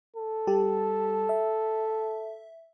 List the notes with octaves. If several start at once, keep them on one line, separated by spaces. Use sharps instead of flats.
A4
G3 G4 A5
E5